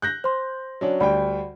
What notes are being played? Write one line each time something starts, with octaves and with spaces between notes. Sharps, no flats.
F#6 G6 A#6
C5 C6
F#3 C#4 D4
D2 G3 D5 G5 B5